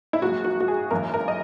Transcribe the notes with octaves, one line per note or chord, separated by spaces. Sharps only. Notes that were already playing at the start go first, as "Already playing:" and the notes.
E4
A#1 G#2 F#3 A#3 F#4
F#4
F#4
G#4
G#1 F#2 E3 A#3 A#4
A#4
D#5